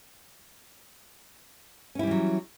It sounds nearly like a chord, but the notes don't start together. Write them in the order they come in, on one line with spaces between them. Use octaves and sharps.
C#4 E4 G3 E3 F#3